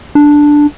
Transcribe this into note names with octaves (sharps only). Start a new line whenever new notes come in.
D4